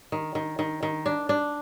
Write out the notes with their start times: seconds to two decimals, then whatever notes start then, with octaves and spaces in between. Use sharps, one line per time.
0.12 D#3
0.35 D#3
0.59 D#3
0.83 D#3
1.06 D4
1.29 D4